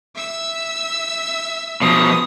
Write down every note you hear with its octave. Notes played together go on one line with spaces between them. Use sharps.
E5 E6
B2 F3 D#6